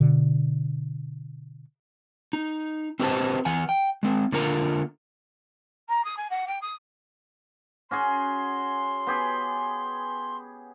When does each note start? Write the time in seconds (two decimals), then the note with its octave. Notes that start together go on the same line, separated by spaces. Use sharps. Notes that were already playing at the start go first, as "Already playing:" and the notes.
0.01 B2 D3
2.33 D#4
3.00 C4 F#4 G4 B4 C5 A5
3.45 E3 F#5 G#5
3.69 G5
4.03 G#3 C4
4.32 D3 A#3 F4 A#4 F#5 A#5
5.88 A#5
6.04 D#6
6.17 G#5
6.30 F#5
6.47 G5
6.61 D#6
7.91 C#4 F#4 G#4 C6
9.07 B3 G4 G#4